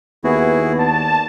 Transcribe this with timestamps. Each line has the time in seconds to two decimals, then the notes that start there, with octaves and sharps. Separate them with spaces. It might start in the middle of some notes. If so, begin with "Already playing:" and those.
0.24 D#2 B3 E4 F#4 G#4
0.78 D5 A5